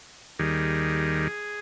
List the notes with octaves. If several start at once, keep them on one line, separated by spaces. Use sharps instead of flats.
D#2 D#3 G3 G#4